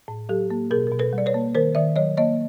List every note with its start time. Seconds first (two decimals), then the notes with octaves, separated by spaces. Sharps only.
0.08 A2
0.29 F#3 G4 A4
0.50 A#3
0.71 B2 G#4 A#4
0.87 A#4
0.92 B2
0.99 A4 B4
1.13 G3
1.18 D5
1.26 B4 C#5
1.34 A#3
1.55 D#3 A#4 C5
1.75 D#3 D5 E5
1.96 F#3 C#5 D#5
2.17 A#3 C#5 D#5